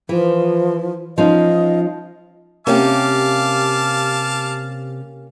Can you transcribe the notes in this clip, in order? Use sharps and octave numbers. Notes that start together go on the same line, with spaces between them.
E3 F3
F3 C#4 D#4 D#5
C3 A#3 C#4 G4 F5 A5 D6